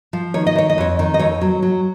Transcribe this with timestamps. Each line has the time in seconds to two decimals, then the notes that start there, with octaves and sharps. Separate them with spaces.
0.13 F3
0.34 D#3 C#5
0.47 D#5
0.55 D#3 C#5
0.70 D#5
0.78 F2 C#5
0.99 D#3
1.14 D#5
1.19 F2 C#5
1.41 F#3
1.63 F#3